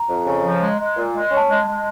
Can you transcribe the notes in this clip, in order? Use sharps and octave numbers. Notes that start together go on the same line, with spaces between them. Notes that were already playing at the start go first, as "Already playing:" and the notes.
Already playing: A#5
F2
C#3
F3
G#3
G#3
A#2
G#3
C#4
A5
G#3
G#3